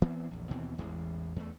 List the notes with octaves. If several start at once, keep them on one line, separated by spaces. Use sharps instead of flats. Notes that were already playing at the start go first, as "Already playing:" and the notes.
E3 B3 C4
A#1 E2
D#2 B2 E3 C4
A1 E2 E3 G#3
E2 A3